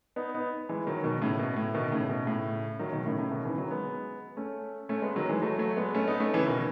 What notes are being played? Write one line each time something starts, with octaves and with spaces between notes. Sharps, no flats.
B3 D#4
B3 D#4
E3 G#3
D#3 F#3
B2 D#3
A2 C#3
B2
A2
B2 D#3
A2 C#3
B2
A2 C#3
D#3 F#3
B2 D#3
A2 C#3
A2 C#3
B2 D#3
C#3 E3
D#3 F#3
G#3 B3
A3 C#4
A3 C#4
G#3 B3
D#3 F#3
E3 G#3
F#3 A3
F#3 A3
G#3 B3
A3 C#4
B3 D#4
A3 C#4
C#3 E3
B2 D#3